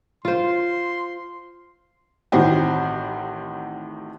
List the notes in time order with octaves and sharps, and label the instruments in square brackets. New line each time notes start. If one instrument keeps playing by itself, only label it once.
[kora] F4 C5 [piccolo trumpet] C6
[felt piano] A1 A2 D#3 C4 F#4 G4